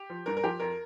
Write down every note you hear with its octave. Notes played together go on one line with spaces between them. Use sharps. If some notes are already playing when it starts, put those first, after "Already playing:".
Already playing: G4
F3
G2 A#4
A#4
F3 G4
F2 A#4